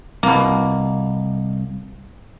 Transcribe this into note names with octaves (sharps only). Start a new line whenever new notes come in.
C2 B2 A#3